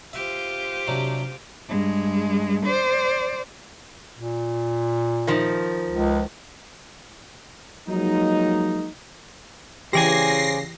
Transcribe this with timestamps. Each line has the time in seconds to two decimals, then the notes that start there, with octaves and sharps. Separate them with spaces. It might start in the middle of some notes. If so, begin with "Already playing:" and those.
0.13 F4 G4 C5 E5
0.88 C3 F#3 D4
1.69 G2 G#3
2.66 C5 D5
4.15 A#2
5.27 D#3 F3
5.90 C#2
7.88 F3 F#3 G#3 A#3 D#4
9.93 C#3 E3 G4 C5 D5 G#5 A#6 C7